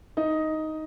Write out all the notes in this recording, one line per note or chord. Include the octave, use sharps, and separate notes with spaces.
D#4 D#5